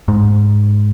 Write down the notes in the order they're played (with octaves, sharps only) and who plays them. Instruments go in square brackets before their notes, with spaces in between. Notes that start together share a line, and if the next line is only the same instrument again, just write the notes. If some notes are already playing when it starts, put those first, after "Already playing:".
[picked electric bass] G#2